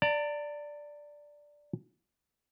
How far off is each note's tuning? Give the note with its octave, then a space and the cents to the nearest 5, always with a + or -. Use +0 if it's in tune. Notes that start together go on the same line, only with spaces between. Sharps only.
D5 +0 A#5 -45